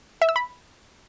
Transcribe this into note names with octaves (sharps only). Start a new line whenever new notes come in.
E5
E6
B5